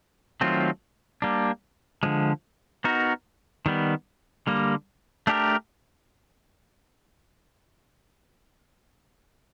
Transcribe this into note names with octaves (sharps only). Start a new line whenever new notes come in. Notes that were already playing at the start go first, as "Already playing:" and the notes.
D#3 F#3 A3 C4 F4
G3 A#3 D4
D3 F3 G#3
B3 D#4 F#4 A#4
D#3 G3 B3
D3 G3 A#3
A3 D4 G4 A#4